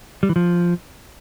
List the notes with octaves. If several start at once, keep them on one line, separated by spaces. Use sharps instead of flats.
G3
E3
F3